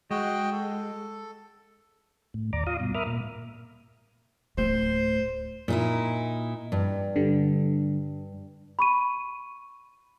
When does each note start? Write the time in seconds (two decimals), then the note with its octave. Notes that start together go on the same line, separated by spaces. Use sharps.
0.11 G#3 F#4 D#5 G5
0.53 A4
2.34 A2
2.53 D#2 D5 A#5 D6
2.67 F4 F5 C6 D#6
2.80 G2 B2
2.94 A#4 E5 B5 D6 D#6 F6
3.07 A#2
4.58 D1 A3 C5
5.68 A#2 D#4 E4
6.72 G2
7.16 D3 G3
8.79 B5 C#6 D#7